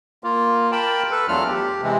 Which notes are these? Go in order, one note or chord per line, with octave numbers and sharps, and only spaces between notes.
A#3 F4
A#4 G5 A5 B5
A4 B4
E2 F#3 A3 D4 F4 F6
G4
C3 E3 G#3